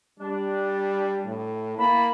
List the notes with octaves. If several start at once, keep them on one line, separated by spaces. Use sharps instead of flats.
G3 D4
A2
A#3 E4 A5 B5